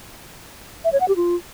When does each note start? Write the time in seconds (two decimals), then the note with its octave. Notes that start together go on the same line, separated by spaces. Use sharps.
0.85 E5
0.93 C#5
1.00 F#5
1.08 G4
1.16 F4